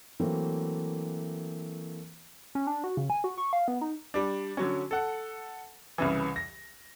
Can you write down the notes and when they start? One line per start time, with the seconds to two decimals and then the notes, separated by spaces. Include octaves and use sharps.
0.20 E3 F#3 A3 A#3 C4
2.55 C#4
2.67 D4
2.84 F#4
2.97 C#3
3.10 G#5
3.24 F#4
3.38 C#6
3.53 F5
3.68 B3
3.81 D#4
4.14 G3 D4
4.57 D3 F#3 C#4
4.91 A4 F#5
5.98 C2 C#3 E3
6.36 A#6